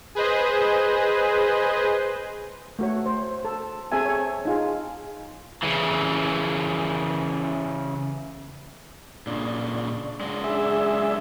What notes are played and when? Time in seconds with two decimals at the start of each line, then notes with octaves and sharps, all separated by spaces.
0.15 G#4 B4 C5 D#5
2.79 A3 F#4 C#5
3.06 C5
3.45 A4
3.92 C4 G#4 A4 E5 G#5
4.06 C#5
4.45 D#4 F4 G#4
5.63 C#3 E3
9.27 A#2 C#3 D4
10.21 C#3 F#3 G#3
10.44 D4 G#4 E5